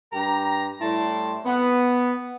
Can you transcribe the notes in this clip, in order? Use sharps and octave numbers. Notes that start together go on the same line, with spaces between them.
G2 G4 A#5
A2 G3 E4 A5 C6
B3